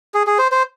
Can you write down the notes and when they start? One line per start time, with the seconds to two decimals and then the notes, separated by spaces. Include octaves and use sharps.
0.14 G#4
0.27 G#4
0.39 C5
0.52 C5